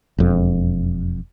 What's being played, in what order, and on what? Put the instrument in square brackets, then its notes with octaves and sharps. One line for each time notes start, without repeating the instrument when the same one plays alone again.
[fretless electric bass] E1 F2